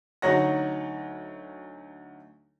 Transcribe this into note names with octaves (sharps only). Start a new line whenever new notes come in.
D2 F#3 D#4 C#5 F#5 A#6